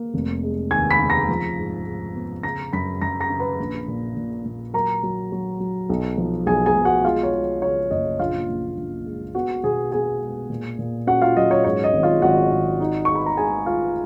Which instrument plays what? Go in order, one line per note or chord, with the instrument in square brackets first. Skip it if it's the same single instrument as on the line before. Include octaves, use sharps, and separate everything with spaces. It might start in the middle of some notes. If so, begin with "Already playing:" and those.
Already playing: [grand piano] A#3
F1
G#3
D#2 G#5 G#6
B5 B6
C#3
A#5 A#6
F3
G#2
G#2
B3
C#3 A#5 A#6
F#2 B5 B6
F#2 A#5 A#6
A#5 A#6
C#3
B4 B5
A#1
A#2
A#2
A#2
F#3 A#4 A#5
F#3
F#3
F#3
B1
F3
B1 G#4 G#5
G#4 G#5
B1
F#4 F#5
G#3 F4 F5
C#5
G#3
C#3 C#5
F#1 D#5
A#1 F4 F5
A#1
A#1
G#3
B3 F#4 F#5
B2 G#4 G#5
B3 G#4 G#5
G#3
A#2
A#2
C#4 F#4 F#5
F4 F5
F#3 D#5
C#5
G#2 C#5
D#5
G#1
F4 F5
G#1 F#4 F#5
G#1
D#4
G#3 C#6
B5
A#5
G#3 G#4 G#5
D#4 F4 F5